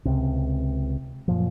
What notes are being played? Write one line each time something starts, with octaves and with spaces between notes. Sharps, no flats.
C#2 C3
F#2 A#2 F3